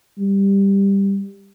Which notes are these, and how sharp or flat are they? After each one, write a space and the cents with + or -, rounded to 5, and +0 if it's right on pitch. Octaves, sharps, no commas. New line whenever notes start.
G3 +10